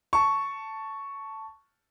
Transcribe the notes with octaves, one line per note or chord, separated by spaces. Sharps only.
A5 C#6